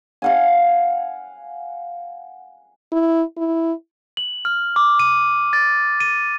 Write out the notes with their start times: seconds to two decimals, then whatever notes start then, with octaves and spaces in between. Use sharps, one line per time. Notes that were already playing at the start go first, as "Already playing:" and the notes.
0.22 F5 F#5 G#5
2.92 E4
3.37 E4
4.17 F#7
4.45 F6
4.76 D6
4.99 D#7
5.53 A6
6.00 D#7